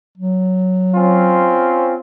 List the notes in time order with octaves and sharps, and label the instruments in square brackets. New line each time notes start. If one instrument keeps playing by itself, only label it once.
[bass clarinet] F#3
[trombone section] C4 C#4 F4